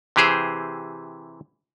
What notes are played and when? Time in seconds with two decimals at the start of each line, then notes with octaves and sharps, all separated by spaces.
0.16 C3 E3 G4 G#4 C5